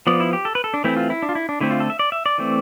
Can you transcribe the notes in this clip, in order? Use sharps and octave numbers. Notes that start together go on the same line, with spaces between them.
F3 B3 D5
E4
G4
A4
B4
A4
D4
E3 A3 C4 E4
F4
E4
D4
F4
E4
D4
D3 A3 C4 E4
F4
A4
E5
D5
E5
D5
E3 A3 C4